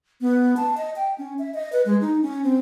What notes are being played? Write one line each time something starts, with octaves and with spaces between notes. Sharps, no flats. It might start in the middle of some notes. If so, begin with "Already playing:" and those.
B3
A5
D#5
G5
C#4
E5
D#5
B4
G#3
D#4
C#4
C4